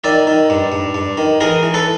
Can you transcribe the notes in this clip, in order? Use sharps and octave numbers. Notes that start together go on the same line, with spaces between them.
D#3 D5 E5
D#3
G2
G2
G2
D#3
E3 G#4 A#4
E3
A4 B4